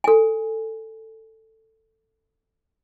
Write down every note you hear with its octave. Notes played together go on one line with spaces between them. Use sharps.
A4 G#5